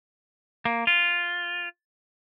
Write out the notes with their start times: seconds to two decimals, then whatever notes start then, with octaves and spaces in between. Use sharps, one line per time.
0.65 A#3
0.87 F4